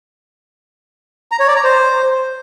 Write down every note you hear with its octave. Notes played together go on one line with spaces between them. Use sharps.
A#5
C#5
D5
A#5
C5